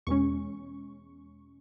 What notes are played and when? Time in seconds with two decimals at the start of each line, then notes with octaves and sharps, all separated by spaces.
0.07 E2 B2 G#3 C#4 C#6